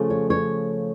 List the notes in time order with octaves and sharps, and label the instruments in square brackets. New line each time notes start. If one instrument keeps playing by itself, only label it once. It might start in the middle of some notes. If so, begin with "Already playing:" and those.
Already playing: [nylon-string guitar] C#3 F3 A3
C#5
C#5